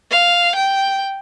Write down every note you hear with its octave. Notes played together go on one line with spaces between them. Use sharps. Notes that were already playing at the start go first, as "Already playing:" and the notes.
F5
G5